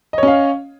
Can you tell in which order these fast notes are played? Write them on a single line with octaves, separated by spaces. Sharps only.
D#5 C#5 C#4 F5